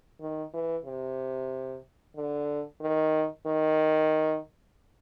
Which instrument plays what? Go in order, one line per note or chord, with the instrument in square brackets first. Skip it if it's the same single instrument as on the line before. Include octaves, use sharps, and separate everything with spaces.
[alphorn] D#3
E3
C3
D3
D#3
D#3